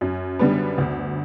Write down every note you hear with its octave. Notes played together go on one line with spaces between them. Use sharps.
F#2
D3 G3 B3
D2